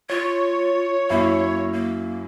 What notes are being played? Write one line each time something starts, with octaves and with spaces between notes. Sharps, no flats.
F4 C#5
F#2 A#3 E4
A#3